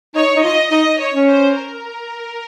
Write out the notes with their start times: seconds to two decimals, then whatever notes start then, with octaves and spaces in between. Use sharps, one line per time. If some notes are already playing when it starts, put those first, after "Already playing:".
0.15 D#4 C#5
0.36 D#4
0.44 F4 D#5
0.71 D#4 D#5
1.00 C#5
1.14 C#4
1.28 C5
1.56 A#4